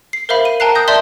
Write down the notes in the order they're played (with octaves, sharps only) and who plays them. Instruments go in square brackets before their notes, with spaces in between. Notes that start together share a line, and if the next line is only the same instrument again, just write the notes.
[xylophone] C7
A#4 C5 E5 F5 B5
D#7
A#4 G5 A5 A#5 F#6 C7
D#6 G6 A#6
D5 E5 A5 C6 G6 G7